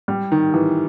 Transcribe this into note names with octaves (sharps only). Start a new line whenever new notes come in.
G3
D#3
E3